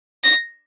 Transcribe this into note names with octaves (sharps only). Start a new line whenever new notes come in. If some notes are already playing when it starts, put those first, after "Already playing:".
A#6